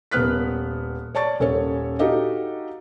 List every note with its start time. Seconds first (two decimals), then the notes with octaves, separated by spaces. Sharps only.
0.12 D#1 A#3 B3 F6 F#6 B6
1.15 C#5 D5 A5 C#6 A6
1.40 D#1 C#4 A4 A#4 C#5
1.99 D#4 F#4 G4 A4 D#5 F5